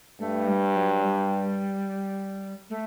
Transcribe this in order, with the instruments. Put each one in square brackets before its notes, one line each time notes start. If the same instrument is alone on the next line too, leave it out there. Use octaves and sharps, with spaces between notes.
[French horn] G2 [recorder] A3
[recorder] G3
F#3
G3
A3